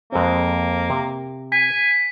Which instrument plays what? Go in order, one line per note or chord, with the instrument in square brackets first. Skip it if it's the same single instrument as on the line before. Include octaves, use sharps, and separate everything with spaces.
[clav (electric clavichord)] F2 G#3 C4 [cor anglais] A#3
[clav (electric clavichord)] C3
[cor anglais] G#5 [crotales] B6